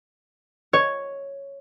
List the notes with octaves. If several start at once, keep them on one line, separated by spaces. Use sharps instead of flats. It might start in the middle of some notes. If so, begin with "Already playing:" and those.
C#5